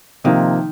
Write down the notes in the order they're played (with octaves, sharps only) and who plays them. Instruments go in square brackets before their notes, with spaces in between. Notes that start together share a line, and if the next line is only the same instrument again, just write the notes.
[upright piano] C3 F3 A#3 [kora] D#3